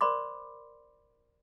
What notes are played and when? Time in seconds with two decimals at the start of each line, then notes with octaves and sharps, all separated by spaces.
0.01 A#4 C5 D5 B5 C6 D6